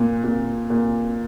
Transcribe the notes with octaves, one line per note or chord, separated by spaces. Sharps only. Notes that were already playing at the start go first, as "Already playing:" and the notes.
Already playing: A#2
A#2
A#2